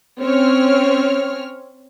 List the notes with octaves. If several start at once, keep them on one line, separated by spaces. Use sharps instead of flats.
C4 C#4 C#5 F6